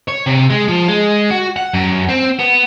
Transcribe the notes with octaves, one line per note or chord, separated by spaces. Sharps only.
C#5
C3
G#3
F3
G#3
F#4
F#5
F#2
C4
B3